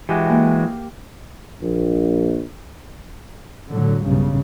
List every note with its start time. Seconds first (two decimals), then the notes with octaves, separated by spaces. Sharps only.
0.09 E3 G#3 F#4 G4
0.30 A#3
1.61 A#1
3.71 A2 D3 F#3
4.05 B1 G2 C#3